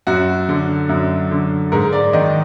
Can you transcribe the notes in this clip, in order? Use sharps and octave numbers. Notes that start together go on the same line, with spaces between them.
F#2 F#4
D3
F#2
D3
G#2 A#4
D5
D#3 D#5